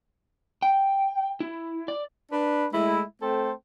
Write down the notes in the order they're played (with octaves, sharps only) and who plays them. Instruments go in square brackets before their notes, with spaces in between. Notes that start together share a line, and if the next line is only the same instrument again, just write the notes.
[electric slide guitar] G5
E4
D5
[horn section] D4 B4
G#3 A3 E4
A3 C4 A4 C5 G5